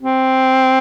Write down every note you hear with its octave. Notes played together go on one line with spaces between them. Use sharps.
C4